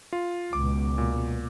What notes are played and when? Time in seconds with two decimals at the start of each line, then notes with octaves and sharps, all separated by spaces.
0.13 F4
0.53 C#2 B2 D6
0.98 A#2